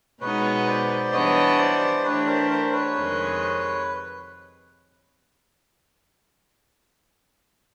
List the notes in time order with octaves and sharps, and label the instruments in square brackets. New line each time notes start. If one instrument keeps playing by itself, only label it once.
[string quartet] B2 G#3 B3 D#4 [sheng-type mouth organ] B4 C#5
[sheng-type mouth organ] C5 D5
[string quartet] E3 G3 B3 D4 [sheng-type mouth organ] C#5 D#5
[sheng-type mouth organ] C5 D5
[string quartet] E3 A3 D4 G4 [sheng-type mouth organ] B4 C#5
[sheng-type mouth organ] A#4 C5
A#4 C5
B4 C#5
[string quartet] F2 C3 D#3 G#3